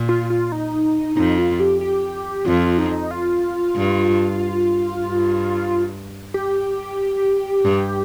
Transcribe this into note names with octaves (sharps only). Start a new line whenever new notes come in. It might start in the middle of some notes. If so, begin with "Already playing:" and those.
Already playing: A#2
F4
F4
D#4
F2 D#4
F4
G4
G4
F2 F4
D#4
F4
G2
G2
G4
G2